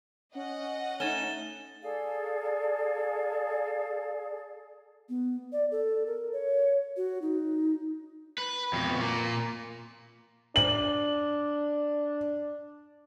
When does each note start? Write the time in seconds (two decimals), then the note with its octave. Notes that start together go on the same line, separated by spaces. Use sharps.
0.35 C#4 D#5 F#5
1.00 A3 C#4 D#4 A6 E7 G7
1.83 G#4 A4 D5 F5
5.09 B3
5.53 D5
5.72 A4
6.07 A#4
6.33 C#5
6.97 F#4
7.22 D#4
8.38 B4
8.73 F2 B2
9.00 A#2
10.56 D4 F#7